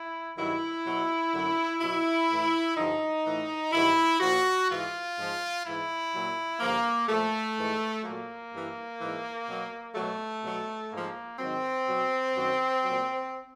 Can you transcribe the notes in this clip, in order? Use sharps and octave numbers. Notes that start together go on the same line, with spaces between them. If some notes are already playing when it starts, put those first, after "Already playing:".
Already playing: E4
G2 D#3 F#3 E4
B2 F#3
F#2 D3 F#3
B2 F#3 E4
A2 E3
G2 D3 F3 D#4
A2 E3
G2 D#3 F#3 E4
A#2 F3 F#4
G#2 E3 F4
G#2 F3
G#2 E3 E4
A#2 F#3
G2 D3 F3 A#3
A#2 F3 A3
G#2 E3
A#2 F#3 A#3
G2 E3
G#2 E3
B2 F#3
B2 F#3 A3
B2 F#3
G#2 F3 A#3
G#2 D#3 F#3 C4
B2 F#3
F#2 D#3 F#3
A#2 F#3